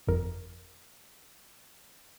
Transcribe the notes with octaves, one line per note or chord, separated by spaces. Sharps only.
G1 F2 A#4